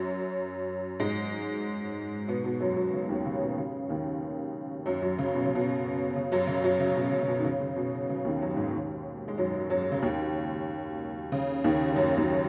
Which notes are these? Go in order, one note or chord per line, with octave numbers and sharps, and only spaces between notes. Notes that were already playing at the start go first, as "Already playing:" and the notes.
Already playing: F#2 F#3
G#2 G#3
B2 B3
B2 B3
F#2 F#3
F#2 F#3
C#3
D#2 D#3
C#3
B2
C#3
D#2 D#3
F#2 F#3
F#2 F#3
C#3
B2
C#3
B2
C#3
F#2 F#3
C#3
F#2 F#3
C#3
B2
C#3
C#3
B2
D#3
C#3
C#3
B2
C#3
D#2 D#3
F#2 F#3
G#2 G#3
D#2 D#3
G#3
F#2 F#3
F#2 F#3
C#3
D#2 D#3
C#3
D#2 D#3
D#3
F#2 F#3
D#2 D#3